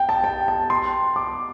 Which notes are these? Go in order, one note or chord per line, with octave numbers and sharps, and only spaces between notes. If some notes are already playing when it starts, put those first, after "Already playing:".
Already playing: G5
A5
G5
A5
C6
D6